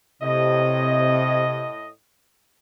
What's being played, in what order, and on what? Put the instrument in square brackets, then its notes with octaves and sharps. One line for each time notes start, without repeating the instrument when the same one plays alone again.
[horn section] A2 D#5 [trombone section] C3